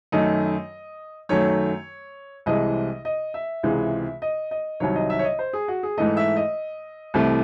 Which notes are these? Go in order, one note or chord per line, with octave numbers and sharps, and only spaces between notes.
F#2 D#3 A3 D#5
F#2 D#3 F#3 A3 C#5
C2 C3 E3 G#3 D#5
D#5
E5
C#2 C3 E3 G#3
D#5
D#5
C2 C3 D#3 F#3 C#5
D#5
E5
C#5
D#5
C5
G#4
F#4
G#4
G#2 E3 A3 D#5
E5
D#5
C2 C3 E3 A3